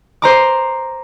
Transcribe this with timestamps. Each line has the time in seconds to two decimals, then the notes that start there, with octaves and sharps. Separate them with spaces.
0.22 C5 A#5 D6